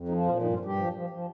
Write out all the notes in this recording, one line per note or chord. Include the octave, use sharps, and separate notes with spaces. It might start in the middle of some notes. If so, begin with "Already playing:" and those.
Already playing: F2
F3 D#4
A#2 F4
G2 D#4
F4
G2
G4
F3
F3
F3